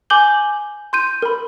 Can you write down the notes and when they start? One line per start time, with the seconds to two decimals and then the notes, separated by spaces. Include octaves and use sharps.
0.10 G#5 D6 G6 F#7 G7
0.93 C6 G6 D#7
1.22 A#4 B5